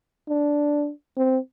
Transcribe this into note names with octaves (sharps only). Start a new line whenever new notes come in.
D4
C4